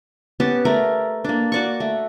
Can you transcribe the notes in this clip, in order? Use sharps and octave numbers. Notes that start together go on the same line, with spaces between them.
B3 C#4 G4 A5
A3 A#4 D5
A#3 D4
F#4 D5 C#6
A3